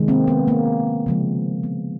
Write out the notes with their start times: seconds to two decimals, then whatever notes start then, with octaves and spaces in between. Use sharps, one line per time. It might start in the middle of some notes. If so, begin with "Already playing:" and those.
Already playing: C3 D#3 G#3
0.08 A#3 C4
0.28 B3
0.48 A#3
1.06 C#3 F3 G#3
1.63 B3